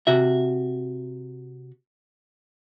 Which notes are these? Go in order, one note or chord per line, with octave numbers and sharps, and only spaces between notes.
C3 F#4 E5